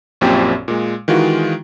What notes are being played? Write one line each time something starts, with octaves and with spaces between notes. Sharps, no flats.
A#1 F#2 A#2 C4 G4 G5
A#2 G#3
D#3 E3 G#3 F4 F#4